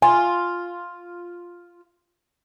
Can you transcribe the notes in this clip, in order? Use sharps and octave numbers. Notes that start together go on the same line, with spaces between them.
F4 G#5